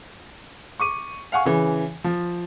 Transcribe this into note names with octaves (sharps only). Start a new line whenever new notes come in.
C#6 D6 D#7
F5 F#5 G#5 C#6
C#3 E3
F3